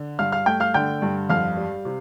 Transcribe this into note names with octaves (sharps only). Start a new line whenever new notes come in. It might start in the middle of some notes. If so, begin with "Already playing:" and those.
Already playing: D3
G2 F5 F6
F5 F6
A3 G5 G6
F5 F6
D3 G5 G6
G2
F2 F5 F6
G3
C3